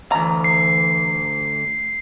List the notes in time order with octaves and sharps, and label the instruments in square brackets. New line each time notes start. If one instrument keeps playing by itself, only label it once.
[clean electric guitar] D2 A#5 [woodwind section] E3
[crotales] C7